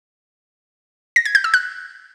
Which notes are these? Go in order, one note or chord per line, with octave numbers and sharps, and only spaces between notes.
A#6
G#6
G6
E6
F#6